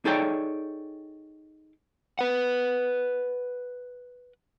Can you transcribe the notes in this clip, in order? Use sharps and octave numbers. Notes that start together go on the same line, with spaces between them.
D#4 G#4 A4 C#5 D5 G5
B4 F#5